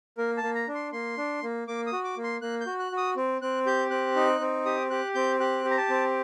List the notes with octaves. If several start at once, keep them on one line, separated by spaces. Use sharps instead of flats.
A#3 A#4
A5
A#3
A#5
D4
C6
A#3 C6
D4
A#3
A#3 D6
D#6
F#4
D6
A#3
C6
A#3 F#6
G6
F#4
F#6
F#4
D#6
C4
C4 F#6
G4 G6
C4 F#6
D#4
C4
G4 D#6
G4 F#6
C4 G6
G4 F#6
G4
A#5
A5
C4